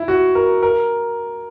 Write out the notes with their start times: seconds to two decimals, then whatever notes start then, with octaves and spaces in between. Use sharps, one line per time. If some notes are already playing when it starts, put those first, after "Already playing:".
Already playing: E4
0.08 F#4
0.35 A#4
0.63 A#4